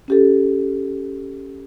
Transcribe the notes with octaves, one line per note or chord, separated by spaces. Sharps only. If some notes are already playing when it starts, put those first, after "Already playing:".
C#4 G4 A4